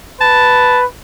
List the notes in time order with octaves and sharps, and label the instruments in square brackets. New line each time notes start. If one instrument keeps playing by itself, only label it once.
[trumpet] B4 [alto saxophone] A5